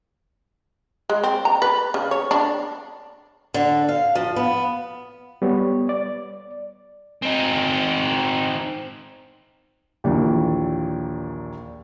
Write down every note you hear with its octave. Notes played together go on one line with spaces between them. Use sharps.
G#3
C4
A#5
B4
C#3
C#5
D4
D3
F5
F3
B3
G3 B3 C#5
D5
C4 D#4
A#1 D#2 A#2 E3